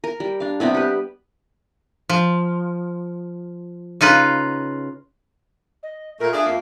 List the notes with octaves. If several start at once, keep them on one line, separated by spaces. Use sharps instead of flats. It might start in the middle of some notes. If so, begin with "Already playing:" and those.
A#4
G3
D4 F5
C3 G3 B3 C4
G4 B4
F3
C#3 D#4 F4 B4
D#5
A#2 A3 A#4
D4 F4 G#4 E5
F2 A#3